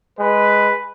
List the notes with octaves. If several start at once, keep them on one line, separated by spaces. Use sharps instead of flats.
G#3 B4